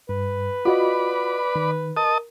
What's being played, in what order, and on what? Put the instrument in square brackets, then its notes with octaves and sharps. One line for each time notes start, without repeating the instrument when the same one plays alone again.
[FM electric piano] G2 [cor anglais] B4
[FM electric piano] F4 F#4 D#5 [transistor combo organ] D5 B5
[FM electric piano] D#3
[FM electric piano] A#4 [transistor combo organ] D#5 A5 D#6